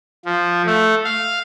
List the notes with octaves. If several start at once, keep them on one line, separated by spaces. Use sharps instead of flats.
F3
A3
F5